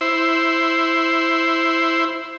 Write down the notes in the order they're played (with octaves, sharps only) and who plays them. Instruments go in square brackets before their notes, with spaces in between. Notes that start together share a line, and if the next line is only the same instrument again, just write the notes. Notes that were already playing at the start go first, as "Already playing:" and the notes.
[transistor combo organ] E4 C5